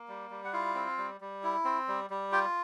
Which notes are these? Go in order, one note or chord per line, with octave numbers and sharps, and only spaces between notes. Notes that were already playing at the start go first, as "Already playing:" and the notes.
Already playing: A#3
G3
G3
F#5
E4 F4 F5
C4
G3
G3
E4
C4
G3
G3
F4 G4 G5